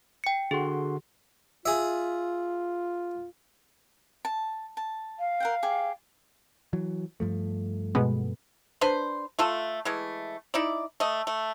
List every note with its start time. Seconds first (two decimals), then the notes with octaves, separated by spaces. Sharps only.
0.24 G5 C#7
0.51 D3 F#4 G#4 C6
1.66 F4 G#4 E5
4.25 A5
4.77 A5
5.19 F5
5.40 A#4 F#5 G5
5.63 G4 G#4
6.73 E3 F#3
7.20 G2 F3 A3
7.95 B2 G#3 B3
8.81 D4 B4 C5
9.39 A3 F4 A4
9.85 E3 G#3 A3
10.54 D#4 E4 D5
11.00 A3 D#5
11.27 A3